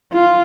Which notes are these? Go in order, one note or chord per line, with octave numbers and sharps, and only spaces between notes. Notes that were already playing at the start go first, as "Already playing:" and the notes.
F4